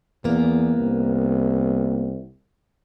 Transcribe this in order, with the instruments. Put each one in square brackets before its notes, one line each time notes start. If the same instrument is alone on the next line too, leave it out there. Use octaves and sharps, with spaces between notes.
[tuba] E2 [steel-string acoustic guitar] A#3 B3
[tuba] C2